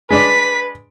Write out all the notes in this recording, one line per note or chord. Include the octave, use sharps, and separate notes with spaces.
G#3 D4 B4 D5 B6